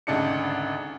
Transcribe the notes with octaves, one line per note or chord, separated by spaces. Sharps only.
G#1 D2 C#3 D4 D#4 C#7